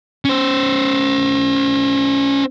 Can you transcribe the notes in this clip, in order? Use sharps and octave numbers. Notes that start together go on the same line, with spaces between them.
C#4 C5